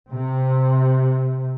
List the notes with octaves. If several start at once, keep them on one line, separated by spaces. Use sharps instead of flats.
C3